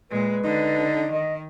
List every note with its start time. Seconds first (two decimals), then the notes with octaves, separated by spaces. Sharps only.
0.11 A#2 G#3 B4
0.44 D3 D#4
1.11 D#3 D#5